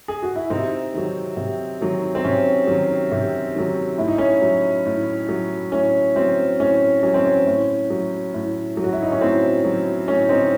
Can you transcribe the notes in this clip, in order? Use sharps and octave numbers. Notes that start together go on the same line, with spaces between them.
G#4
F#4
E4
C3 C4 D#4
D#3 F#3
C3
D#3 F#3
C4
C3 C#4
D#3 F#3
C3
D#3 F#3
A2 E4
D#4
C#4 E4
F#3
A2
F#3
A2 C#4
F#3 C4
A2 C#4
F#3 C#4
C4
C#4
A2
F#3
A2
F#3
F#4
E4
D#4
C#4
A2 C4
F#3
A2 C#4
C4 D#4